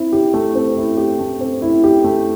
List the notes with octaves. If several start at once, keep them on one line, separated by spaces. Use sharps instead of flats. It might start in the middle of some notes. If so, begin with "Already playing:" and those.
Already playing: C4 E4
G4
A3
C4
E4
G4
A3
C4
E4
G4
A3